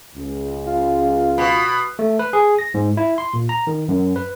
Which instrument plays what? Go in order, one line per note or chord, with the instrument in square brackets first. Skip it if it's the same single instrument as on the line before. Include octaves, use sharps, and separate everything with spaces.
[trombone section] C#2
[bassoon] F4
[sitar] B2 [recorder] B5
[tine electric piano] A3
B4
G#4
A#6
G#2
E4
C6
A#2
A#5
D#3
F#2
B4